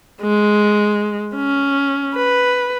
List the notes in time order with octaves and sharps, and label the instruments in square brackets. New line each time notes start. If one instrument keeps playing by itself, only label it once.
[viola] G#3
C#4
B4